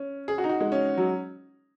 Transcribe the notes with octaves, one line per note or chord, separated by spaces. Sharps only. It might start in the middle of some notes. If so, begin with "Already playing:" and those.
Already playing: C#4
G#4
F#4
D#4
F#4
G#3
C#4
F#3